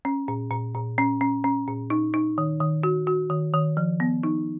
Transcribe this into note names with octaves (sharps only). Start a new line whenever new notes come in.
C#4
A#2
A#2
A#2
C#4
C#4
C#4
A#2
D#4
D#4
D#3
D#3
F#4
F#4
D#3
D#3
F3
B3
D#4